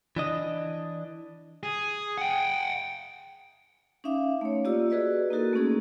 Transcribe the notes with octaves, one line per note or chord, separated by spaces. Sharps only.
E3 D4 D#5
G#4
F#5 G5
C#4 D#4 E5 F5 D6
A3 C#5
A#3 F4 G4 D5 E6
F#4 G#4 B4 D5 D#5
A#3 D#4 E4 F#4 A4 A#4
A3 A#3 C#4 G#4